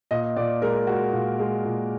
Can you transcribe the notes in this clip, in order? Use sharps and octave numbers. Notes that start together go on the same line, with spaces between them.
A#2 D#5
A#2 D5
G#3 A#4
G#3 F#4
A#2
G#3
A#2